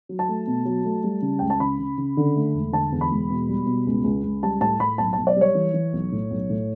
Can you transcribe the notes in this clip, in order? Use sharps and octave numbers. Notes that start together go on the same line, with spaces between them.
F#3
A5
A3
B2
F#3
A3
G3
C#3
C#2 G5
A5
C#3 B5
C#3
C#3
D3
A3
E1
D3 A5
E2
B5
E1
B2
G3
B2
C#2
C#2
C#2
G3 A5
A2 A5
A2 B5
B1 A5
B1 A5
D5
G3 C#5
E3
E3
B1
A2
B1
A2